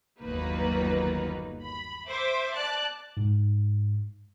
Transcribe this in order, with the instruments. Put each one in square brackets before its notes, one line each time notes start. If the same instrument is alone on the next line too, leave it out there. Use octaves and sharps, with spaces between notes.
[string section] G1 D#2 F#3 A#3 D#4 B4
B5
C5 E5 D6
D5 A5 F#6
[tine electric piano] G#2